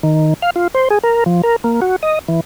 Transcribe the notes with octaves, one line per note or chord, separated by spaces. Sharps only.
D#3
F5
F4
C5
G#4
A#4
F3
A#4
A#3
F#4
D#5
E3